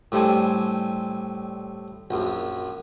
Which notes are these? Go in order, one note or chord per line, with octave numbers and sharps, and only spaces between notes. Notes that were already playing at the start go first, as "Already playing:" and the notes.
A2 G3 C4 D4 G#5
A#1 F#2